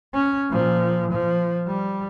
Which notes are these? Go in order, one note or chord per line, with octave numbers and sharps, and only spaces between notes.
C#4
A#2 F3
F3
G3